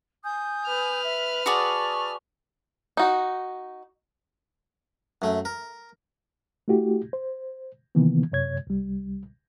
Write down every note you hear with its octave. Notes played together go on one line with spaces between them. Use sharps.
G#5 D#6 G6
B4 F6
E5
F#4 G#4 D5 A5 C#6 D#6
D#4 F#4
F#2 A3
A#4
A3 E4 F#4 G4
C5
C3 D#3 E3 A#3 B3
F#2 C3 C#5 G#6
C2 G3